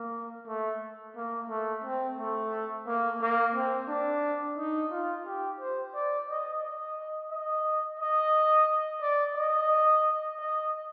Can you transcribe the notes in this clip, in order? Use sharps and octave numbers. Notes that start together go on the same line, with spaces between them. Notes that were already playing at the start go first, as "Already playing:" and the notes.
Already playing: A#3
A3
A#3
A3
C4
A3
A#3
A#3
C4
D4
D#4
F4
G4
C5
D5
D#5
D#5
D#5
D#5
D5
D#5
D#5